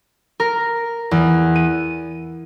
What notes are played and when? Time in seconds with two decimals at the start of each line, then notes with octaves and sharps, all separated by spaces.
0.40 A#4
1.11 E2
1.56 D#7